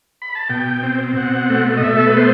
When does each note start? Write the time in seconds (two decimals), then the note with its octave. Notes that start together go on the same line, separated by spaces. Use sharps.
0.22 B5
0.35 A5
0.50 B2 G5
0.83 C4
1.17 B2 F#5
1.50 A3
1.77 D#5
1.83 B2 E5
1.97 A4
2.07 B4
2.17 B3 C5